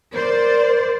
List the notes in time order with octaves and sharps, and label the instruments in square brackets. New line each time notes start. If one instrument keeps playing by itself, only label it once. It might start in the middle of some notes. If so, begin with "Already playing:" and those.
[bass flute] A#4 [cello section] C5 D5